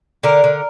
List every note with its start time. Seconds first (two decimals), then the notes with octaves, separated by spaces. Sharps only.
0.23 D3 A#4
0.44 D3